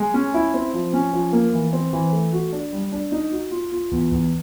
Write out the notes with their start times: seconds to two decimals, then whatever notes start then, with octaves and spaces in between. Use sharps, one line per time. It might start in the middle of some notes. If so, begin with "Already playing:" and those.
Already playing: G#3
0.14 C#4
0.34 E4
0.54 C4
0.74 F3
0.93 C#4
1.13 F3
1.33 A#3
1.53 E3
1.73 C4
1.93 E3
2.13 A3
2.33 F#4
2.52 D4
2.73 G3
2.92 D4
3.12 D#4
3.32 F#4
3.51 F4
3.72 F4
3.91 E2
4.11 E2